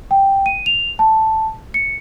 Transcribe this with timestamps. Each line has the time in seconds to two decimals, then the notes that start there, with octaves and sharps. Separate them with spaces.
0.11 G5
0.46 D#7
0.66 F7
0.99 A5
1.74 C#7